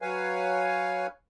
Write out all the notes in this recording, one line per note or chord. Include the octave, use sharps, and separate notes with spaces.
F#3 B4 C#5 F5 G#5